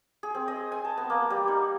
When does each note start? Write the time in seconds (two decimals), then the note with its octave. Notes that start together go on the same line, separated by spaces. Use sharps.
0.23 G#4
0.35 C4
0.48 D#5
0.72 G#5
0.85 A5
0.97 B3
1.10 A#3
1.30 G3
1.48 D#4